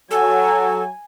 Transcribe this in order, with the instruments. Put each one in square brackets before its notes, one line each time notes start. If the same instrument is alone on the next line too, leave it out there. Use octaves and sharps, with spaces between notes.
[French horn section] F#3 [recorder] A4 [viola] G#5